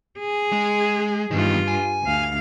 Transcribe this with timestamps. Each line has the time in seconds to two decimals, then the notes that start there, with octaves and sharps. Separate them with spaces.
0.19 G#4
0.52 G#3
1.31 E2 G2 D#3 F4
1.68 G#5
2.03 D2 F5